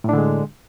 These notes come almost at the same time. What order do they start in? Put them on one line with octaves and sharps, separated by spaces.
A2 D4 D3 G#3